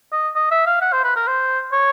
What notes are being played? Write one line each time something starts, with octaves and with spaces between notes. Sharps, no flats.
D#5
D#5
E5
F5
F#5
C5
B4
A#4
C5
C#5